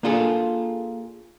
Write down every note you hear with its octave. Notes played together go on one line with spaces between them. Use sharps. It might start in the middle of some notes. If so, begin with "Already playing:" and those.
A#3 D4 F4 G#4 A4